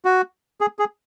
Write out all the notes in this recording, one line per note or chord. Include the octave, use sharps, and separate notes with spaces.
F#4
G#4
G#4